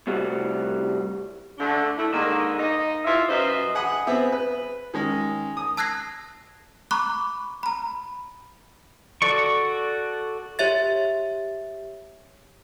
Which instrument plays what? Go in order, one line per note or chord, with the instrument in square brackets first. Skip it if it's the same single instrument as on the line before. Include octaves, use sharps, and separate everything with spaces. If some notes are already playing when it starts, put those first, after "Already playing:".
[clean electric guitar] A2 C3 G3 F#4
[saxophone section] D3 A3 D4
A3 E4
G#2 D3 D#3 A#3
D#4 D#5
E4 F4 G4 E5
F#2 B4 C5 D#5 E5
[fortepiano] G#4 F#5 B5 D#6
B3 C4 G#4 E5
B4
D#3 G#3 C#4
D#6
[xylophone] A5 E6 F#6 G#6 A#6 C7
A#5 B5 C#6 D6 F#6
A#5 B5
[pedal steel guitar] F#4 A4 D5 C#6
[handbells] G4 C#5 E5 A6